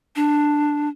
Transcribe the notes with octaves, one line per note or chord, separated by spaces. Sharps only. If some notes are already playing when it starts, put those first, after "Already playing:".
D4